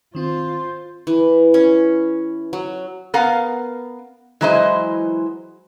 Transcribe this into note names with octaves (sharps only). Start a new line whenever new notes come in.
D#3 C4 F4 C5
E3
C#4
F#3
B3 A#4 F5 F#5
E3 F#3 G#3 E4 C5 D#5